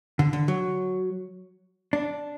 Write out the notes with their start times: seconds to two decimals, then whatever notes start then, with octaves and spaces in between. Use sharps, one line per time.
0.19 D3
0.33 D3
0.48 F#3
1.93 D4